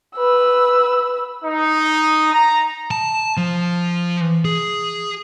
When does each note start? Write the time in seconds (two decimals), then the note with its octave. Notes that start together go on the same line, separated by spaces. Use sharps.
0.16 B4 E6
1.44 D#4
2.33 A#5
2.91 A5
3.37 F3
4.45 G#4